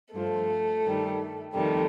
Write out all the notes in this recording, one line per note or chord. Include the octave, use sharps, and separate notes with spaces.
G2 F3 A3
G2 D#3 G3
F2 C3 D#3 G3 A3